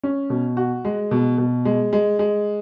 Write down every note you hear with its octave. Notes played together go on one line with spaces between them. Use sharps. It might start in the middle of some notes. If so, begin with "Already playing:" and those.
C#4
B2
F#4
G#3
B2
B2
G#3
G#3
G#3